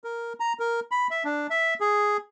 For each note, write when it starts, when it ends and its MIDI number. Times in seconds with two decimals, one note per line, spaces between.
0.04 0.33 70
0.40 0.53 82
0.59 0.80 70
0.91 1.07 83
1.11 1.23 76
1.24 1.47 62
1.50 1.74 76
1.80 2.17 68